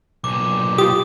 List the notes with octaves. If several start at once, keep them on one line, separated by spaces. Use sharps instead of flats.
B1 A#2 D6
F4 G4 D#6